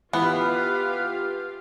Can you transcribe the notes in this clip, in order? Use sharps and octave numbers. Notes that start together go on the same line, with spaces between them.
E3 B3 F4 G4 B4 F5